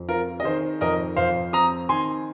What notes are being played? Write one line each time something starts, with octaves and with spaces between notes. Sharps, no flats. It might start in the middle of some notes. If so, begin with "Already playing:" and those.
Already playing: F2
C4 F4 A#4
D#5
D#3 G#4 C5
F2 A#4 D#5
F2 C5 F5
C4 A#5 D#6
D#3 G#5 C6